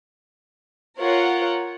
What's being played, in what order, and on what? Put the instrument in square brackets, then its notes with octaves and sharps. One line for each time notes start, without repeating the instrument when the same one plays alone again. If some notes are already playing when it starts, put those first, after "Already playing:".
[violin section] F4 A#4 C#5 F#5